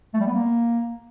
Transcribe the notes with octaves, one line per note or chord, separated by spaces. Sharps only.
A3
G3
B3
A#3